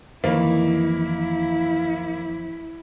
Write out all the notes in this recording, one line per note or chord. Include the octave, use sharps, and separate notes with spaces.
F2 D#3 E3 A#3 E4